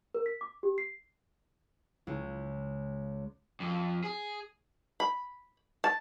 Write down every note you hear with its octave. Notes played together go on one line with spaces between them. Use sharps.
A#4
B6
D6
G4
C7
C#2
F2
G#4
B5
A5